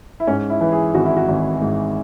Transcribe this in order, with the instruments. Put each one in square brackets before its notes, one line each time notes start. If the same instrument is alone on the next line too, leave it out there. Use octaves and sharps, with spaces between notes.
[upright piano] E4
G#2 C#4
E4
E3
G#4
G#1 F#4
E4
F#4
G#1
G#2